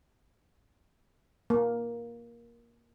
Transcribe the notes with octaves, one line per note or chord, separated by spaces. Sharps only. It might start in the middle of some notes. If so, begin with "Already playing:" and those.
A#3